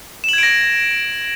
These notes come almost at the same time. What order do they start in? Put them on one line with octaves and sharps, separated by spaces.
E7 F#7 G#6 D7 A#6